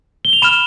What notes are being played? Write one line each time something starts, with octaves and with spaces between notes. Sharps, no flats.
G7
F7
B5 F6 E7